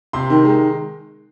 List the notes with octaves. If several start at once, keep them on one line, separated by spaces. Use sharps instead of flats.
C3 C6
D#3
G#3